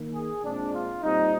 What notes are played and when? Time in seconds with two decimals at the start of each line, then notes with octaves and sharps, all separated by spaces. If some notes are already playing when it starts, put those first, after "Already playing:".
Already playing: D#3 A#3
0.13 G#4
0.43 A#2 G#3 C4 D4
0.72 F4
1.02 A#2 G3 C4 D#4